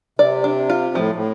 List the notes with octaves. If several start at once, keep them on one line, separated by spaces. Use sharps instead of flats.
C3 D5
D4
F4
A2 F3
A2